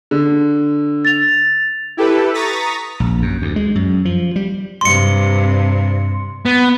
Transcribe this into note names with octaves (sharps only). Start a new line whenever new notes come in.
D3
A6 F7
E4 G4 A4 B4
A#5 C#6 D#6 A6 B6
A#1
F#2
D2
G#3
F#2
F3
G3
G2 C3 C6 C#7
B3